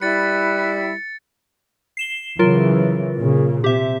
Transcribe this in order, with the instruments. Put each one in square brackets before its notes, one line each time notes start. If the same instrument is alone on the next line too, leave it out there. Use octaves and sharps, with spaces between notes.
[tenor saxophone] G3 [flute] E4 [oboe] B4 [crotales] A6 C#7
[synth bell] C7 E7 G7
[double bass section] C#3 E3 [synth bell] F#3 F4 A#4
[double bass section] A#2 C#3
[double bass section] C3 [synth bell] G4 E5